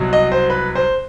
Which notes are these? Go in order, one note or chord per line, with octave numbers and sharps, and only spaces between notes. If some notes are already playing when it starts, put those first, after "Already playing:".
Already playing: C2 B2 F#3
D#5
C5
B4
C5